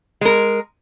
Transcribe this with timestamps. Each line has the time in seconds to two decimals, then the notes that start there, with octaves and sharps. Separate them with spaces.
0.21 G#3 A#4